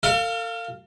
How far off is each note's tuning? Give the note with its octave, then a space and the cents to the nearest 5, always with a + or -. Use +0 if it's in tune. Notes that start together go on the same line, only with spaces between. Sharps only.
A4 +45 F5 +0